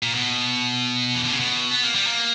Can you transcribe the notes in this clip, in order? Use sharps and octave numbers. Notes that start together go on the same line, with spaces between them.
A#2
B2
E3
D3
C#3
B2
B3
A#3
G3
A#3